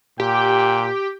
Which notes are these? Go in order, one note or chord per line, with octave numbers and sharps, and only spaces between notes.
A#2 G4 G5